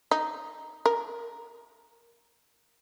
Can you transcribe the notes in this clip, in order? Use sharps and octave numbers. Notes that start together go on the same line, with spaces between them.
D#4
A#4